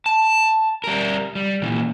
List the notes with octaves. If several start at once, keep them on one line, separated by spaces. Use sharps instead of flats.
A5
G3 A#4
G3
A#2 E3